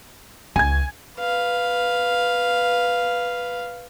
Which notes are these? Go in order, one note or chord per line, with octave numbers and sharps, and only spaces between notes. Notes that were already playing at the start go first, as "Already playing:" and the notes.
C#2 G#5 G#6
B4 F5